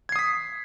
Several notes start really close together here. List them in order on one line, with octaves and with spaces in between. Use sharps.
G#6 C7 D#6 B6